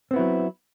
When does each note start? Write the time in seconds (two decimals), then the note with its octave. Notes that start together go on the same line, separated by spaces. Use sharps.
0.11 C4
0.13 B3
0.16 E4
0.19 F#3